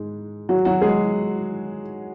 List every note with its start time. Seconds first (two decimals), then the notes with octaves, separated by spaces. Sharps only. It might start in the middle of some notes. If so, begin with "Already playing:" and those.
Already playing: G#2 G#3
0.49 F#3 F#4
0.65 F#3 F#4
0.82 G#3 G#4